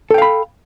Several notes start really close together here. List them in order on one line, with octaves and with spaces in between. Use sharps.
A4 G5 F5 B5